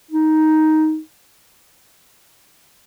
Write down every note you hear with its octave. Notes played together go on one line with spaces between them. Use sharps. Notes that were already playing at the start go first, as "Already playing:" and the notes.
D#4